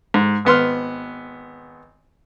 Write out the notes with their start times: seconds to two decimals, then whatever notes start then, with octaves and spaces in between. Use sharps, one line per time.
0.14 G#2
0.45 G#1 B3 C6 F6